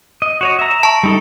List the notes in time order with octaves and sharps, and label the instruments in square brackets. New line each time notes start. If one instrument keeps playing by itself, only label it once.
[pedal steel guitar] D#5
F#4 C#5 D#5
E5 A#5
[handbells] A5 C#6
[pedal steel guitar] G3 D#4 A4